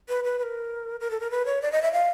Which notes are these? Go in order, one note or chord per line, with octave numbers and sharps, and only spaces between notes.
B4
B4
B4
A#4
A#4
A4
A#4
B4
C#5
D5
D#5
E5
F5